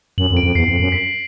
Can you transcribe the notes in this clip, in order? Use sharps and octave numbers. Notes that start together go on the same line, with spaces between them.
F#2 F#7
F2
D7
F2
E2 C7
F2
F#2
B6